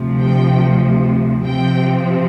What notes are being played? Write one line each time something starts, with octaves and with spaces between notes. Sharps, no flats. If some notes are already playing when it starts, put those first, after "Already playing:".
Already playing: D2 C3 F3
G5
C3 F3 C4 G5